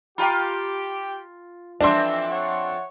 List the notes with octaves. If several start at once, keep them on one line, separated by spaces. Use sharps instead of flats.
F4 G4 G5 A#5 B5
F2 E3 C4 D4 E5 C6
C#5 F#5